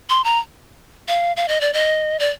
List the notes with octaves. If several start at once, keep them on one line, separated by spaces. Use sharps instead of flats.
C6
A#5
F5
F5
D#5
D5
D#5
D5